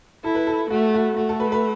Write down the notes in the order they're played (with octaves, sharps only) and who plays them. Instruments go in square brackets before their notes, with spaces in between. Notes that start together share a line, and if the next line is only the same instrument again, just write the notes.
[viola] E4 [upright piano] A4
[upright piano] B4
A4
[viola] A3 [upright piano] F#4
[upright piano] F#4
[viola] A3 [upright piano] F#4
[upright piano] A4
B4
B4